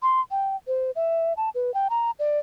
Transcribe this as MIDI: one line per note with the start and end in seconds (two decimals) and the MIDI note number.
0.03 0.21 84
0.31 0.56 79
0.67 0.91 72
0.96 1.33 76
1.37 1.50 81
1.55 1.73 71
1.74 1.88 79
1.90 2.11 82
2.19 2.40 74